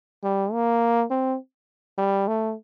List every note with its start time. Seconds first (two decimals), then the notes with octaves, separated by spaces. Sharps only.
0.23 G3
0.53 A#3
1.11 C4
1.98 G3
2.28 A3